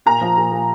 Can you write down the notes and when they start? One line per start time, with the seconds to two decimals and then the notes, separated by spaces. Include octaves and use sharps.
0.06 A#2 A#5
0.21 F3
0.37 A#2
0.52 A#2